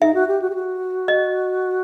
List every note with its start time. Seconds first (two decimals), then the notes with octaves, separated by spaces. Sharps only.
0.01 D#4 E5
0.15 F#4
0.28 G4
0.42 F#4
0.50 G4
0.55 F#4
1.08 D#5